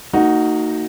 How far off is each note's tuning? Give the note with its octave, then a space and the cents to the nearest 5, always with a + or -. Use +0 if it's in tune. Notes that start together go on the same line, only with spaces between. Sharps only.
A#3 -45 D#4 +0 F#4 +0